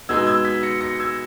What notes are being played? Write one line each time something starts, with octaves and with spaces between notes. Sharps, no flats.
B2 G#3 B3 D#4 E6 G#6
E6 G#6
G#6 B6
A#6 C#7
A#6 C#7
E6 G#6